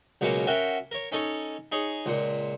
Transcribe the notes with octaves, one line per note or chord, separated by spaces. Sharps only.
C#2 B2 F#3 A#3 C#4
C#4 F#4 A#4 E5 F#5 G5
A#4 C#5
C#4 D#4 A4 C#5
D#4 G#4 C#5
C#2 A#2